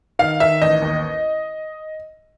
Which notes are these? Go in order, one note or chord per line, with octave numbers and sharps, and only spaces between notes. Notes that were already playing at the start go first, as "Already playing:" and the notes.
D#3 F5
D#3 E5
A1 D#5
D#2